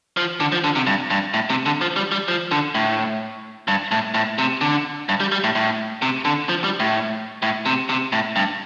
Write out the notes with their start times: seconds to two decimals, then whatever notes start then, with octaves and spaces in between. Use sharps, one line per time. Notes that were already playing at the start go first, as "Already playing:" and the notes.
0.17 F3
0.40 D3
0.52 F3
0.64 D3
0.76 C3
0.87 G2
1.10 G2
1.34 A2
1.50 C3
1.66 D3
1.81 F3
1.96 G3
2.12 G3
2.28 F3
2.51 D3
2.75 A2
3.68 G2
3.91 A2
4.14 A2
4.38 C3
4.61 D3
5.09 G2
5.20 G3
5.32 G3
5.44 A2
5.55 A2
6.02 C3
6.25 D3
6.49 F3
6.64 G3
6.80 A2
7.42 A2
7.66 C3
7.89 C3
8.12 A2
8.36 G2